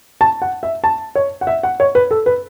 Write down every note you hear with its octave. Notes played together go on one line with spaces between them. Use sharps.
A5
F#5
E5
A5
C#5
F#5
E5
F#5
C#5
B4
A4
B4